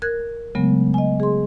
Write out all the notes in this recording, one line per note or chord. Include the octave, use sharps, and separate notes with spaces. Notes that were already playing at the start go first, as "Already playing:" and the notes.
A#4 F#6 G#6
C#3 F#3 G#3 A3 B3
D#5 G#5
G#4 C6